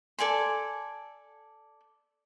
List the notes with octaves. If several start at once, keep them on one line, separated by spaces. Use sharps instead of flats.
A4 D5 G#5 C6